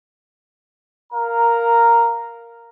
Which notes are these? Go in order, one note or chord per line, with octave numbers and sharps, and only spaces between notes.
A#4 F5 A#5